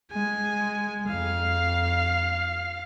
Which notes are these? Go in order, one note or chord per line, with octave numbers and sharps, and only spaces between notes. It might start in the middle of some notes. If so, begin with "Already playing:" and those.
G#3 G#5
F2 F5